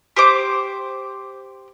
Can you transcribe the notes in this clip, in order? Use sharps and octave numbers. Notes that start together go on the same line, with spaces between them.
G4 C5 D6